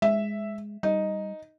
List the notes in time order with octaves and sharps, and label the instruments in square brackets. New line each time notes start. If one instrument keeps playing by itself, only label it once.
[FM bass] G#3 [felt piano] E5
[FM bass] G3 [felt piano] D#4